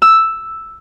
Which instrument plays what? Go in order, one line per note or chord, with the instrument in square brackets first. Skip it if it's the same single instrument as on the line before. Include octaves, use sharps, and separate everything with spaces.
[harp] E6